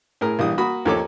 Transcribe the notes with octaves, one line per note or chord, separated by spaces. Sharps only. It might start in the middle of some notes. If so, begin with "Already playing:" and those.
A2 G#4 A#4
A#1 E3 G3 D#6
A#3 F#4 B5 D#6
D#2 F3 A#3 A4 C#5 D6